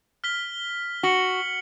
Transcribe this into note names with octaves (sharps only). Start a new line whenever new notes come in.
F6 B6 G7
F#4 C#7 F#7 G7